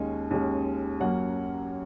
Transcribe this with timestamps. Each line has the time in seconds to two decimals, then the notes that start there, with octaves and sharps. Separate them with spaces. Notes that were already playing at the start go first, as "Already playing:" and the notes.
Already playing: D#2 D#3 G#3 C#4 D#5 G#5
0.31 D#2 D#3 G#3 C#4
1.00 F#2 F#3 A#3 C#4 C#5 F#5